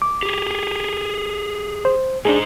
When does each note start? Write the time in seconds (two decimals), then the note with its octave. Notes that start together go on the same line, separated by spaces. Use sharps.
0.02 D6
0.23 G4 G#4
1.85 C5
2.25 G#2 D4 D#4 G#4 C5